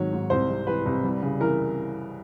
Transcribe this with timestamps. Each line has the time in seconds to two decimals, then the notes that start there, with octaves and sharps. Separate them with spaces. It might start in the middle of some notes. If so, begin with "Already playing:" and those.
Already playing: G#2 D#3 F#3 C#5
0.12 G#2
0.30 C2 C5
0.49 C3
0.67 E3 B4
0.85 C2
1.04 G3
1.22 C#3
1.40 E3 A#4